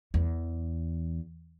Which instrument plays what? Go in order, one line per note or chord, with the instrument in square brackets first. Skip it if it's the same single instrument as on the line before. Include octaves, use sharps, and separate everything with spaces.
[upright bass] E2